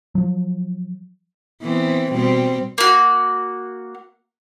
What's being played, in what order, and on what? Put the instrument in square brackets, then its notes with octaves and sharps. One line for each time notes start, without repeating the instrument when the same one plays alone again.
[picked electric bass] F3 F#3
[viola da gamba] E3 B3 C4
B2 G3 C4
[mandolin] A#3 F#4